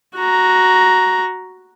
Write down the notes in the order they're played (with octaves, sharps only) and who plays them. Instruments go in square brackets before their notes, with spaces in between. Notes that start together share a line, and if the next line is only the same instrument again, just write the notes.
[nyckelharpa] F#4 A#5